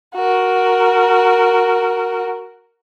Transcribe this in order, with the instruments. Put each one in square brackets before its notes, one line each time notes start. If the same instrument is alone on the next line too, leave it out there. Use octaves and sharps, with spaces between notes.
[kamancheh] F#4 A#4